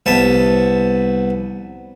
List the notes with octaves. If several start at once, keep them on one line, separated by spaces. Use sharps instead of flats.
C2 B3 A5